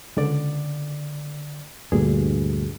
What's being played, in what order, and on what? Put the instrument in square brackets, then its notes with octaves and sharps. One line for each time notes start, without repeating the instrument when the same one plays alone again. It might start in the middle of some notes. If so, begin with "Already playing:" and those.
[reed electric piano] C#2 D3 D5
[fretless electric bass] D2 G2 [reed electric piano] A#2 G#4